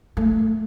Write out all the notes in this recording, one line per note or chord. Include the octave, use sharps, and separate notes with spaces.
A3